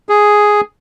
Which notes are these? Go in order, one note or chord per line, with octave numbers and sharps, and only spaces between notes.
G#4